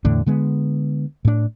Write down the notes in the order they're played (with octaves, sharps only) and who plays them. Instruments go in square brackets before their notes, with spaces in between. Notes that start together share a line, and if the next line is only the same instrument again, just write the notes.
[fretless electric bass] E2 A2 D3 D4
D3 G#3 B3
A2 D4